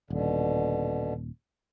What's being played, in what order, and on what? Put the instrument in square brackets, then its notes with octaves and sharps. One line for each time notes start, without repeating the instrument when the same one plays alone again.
[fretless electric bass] D#1 [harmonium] B2 D3